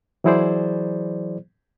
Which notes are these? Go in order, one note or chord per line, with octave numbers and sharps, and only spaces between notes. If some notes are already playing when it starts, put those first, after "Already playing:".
E3 F#3 E4 G#4 C5 D5